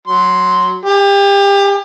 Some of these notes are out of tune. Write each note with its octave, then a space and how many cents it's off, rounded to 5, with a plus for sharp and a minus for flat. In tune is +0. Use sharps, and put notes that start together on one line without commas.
F#3 +0 C6 +0
G4 +30 G#5 +0